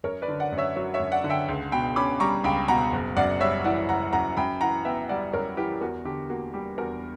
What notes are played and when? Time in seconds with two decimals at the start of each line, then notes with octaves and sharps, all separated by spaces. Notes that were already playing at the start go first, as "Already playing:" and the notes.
0.04 F#2 A#4 C#5
0.22 B4 D5
0.28 D3
0.40 D5 F#5
0.52 F#2
0.58 C#5 E5
0.76 F#3 C#5 E5
0.94 C#5 E5
1.00 F#2
1.12 D5 F#5
1.24 D3
1.30 E5 G5
1.48 C#2
1.72 B2 G5 B5
1.96 C#4 B5 D6
2.20 G3 A#5 C#6
2.44 C#2 G5 B5
2.68 B2 F#5 A#5
2.92 F#1
3.16 F#2 D5 F#5
3.40 G3 C#5 E5
3.64 E3 D5 F#5
3.88 F#1 F#5 A#5
4.13 F#2 F#5 A#5
4.37 F#2 G5 B5
4.61 E3 F#5 A#5
4.85 B3 E5 G5
5.09 G3 D5 F#5
5.33 F#2 A#4 C#5
5.57 E3 G4 B4
5.81 E2 F#4 A#4
6.05 D3 G4
6.29 A#3 F#4
6.53 G3 G4
6.78 E2 F#4 A#4